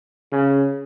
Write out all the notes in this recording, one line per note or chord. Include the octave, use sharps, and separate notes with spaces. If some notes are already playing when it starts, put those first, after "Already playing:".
C#3